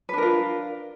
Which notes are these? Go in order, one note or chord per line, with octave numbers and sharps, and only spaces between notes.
D4 F4 A#4 B4